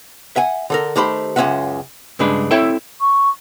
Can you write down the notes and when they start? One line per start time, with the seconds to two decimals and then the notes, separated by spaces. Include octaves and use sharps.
0.36 E5 F#5 G#5
0.70 D3 A4 A#4
0.96 D#3 A3 G4 C5 B5
1.36 C#2 F#2 C#4 F4 E5 F#5
2.19 G2 C#3 G#3 D4 B4
2.51 C4 E4 A4 C#5 E5 G5
3.01 C#6